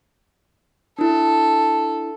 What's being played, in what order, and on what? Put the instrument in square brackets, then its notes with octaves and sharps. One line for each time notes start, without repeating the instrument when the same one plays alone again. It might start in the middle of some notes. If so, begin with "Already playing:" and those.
[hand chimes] D4 E4 [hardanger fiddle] A4